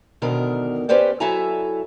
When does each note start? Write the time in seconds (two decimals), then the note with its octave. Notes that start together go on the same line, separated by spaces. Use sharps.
0.22 G#2 B2 D3 D#3 A#4
0.89 C#4 G4 B4 C5 D5
1.20 F#3 E4 A4 E5 G#5 A#5